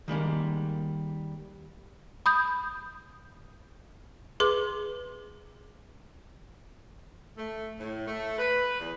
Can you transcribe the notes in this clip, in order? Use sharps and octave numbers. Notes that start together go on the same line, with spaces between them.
D#3 G3 G#3 A#3
B5 D#6 G6
G#4 B4 C6 D6
A3
A2
A3
B4
E2